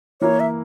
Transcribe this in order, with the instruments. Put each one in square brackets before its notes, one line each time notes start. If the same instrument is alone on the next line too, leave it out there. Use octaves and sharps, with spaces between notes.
[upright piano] E3 A#3 E4 [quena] C#5
[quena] E5